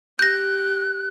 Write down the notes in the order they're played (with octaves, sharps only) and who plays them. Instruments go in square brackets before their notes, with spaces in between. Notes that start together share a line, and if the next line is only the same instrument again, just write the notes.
[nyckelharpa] G4 [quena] F#6 [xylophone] G6 A#6